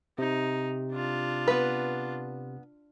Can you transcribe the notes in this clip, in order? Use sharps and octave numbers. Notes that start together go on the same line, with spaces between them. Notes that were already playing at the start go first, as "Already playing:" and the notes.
C3 D#4
D4 F4
B3 B4